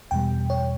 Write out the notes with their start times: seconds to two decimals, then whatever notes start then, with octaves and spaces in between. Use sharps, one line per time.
0.11 E2 B2 G3 G5
0.50 C#5